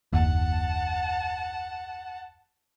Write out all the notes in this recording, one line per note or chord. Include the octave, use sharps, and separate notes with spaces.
F#1 D#2 F#5 A5